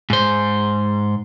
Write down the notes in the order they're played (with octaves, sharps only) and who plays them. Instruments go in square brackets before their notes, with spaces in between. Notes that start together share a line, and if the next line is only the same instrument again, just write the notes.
[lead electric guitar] G#2 C5